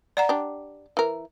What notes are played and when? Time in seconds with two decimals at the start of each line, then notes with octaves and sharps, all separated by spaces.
0.17 D5 F#5 A#5
0.29 D4 G4
0.97 E3 A#4